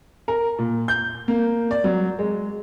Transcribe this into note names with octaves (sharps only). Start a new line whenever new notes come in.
A#4
A#2
G6
A#3
D5
F#3
G#3